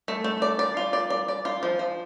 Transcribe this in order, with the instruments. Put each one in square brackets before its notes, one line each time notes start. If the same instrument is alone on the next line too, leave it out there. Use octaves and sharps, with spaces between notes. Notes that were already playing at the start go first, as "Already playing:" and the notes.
[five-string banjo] A3
A3
D5
D5
F4
D5
D5
D5
F4
F3
F3